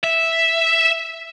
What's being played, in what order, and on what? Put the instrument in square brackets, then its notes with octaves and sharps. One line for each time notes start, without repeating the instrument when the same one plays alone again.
[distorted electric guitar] E5